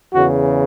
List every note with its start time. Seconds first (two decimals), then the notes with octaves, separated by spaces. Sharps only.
0.14 E2 C#3 E3 F#4